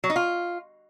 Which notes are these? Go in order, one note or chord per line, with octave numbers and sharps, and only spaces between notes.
F#3
D#4
F4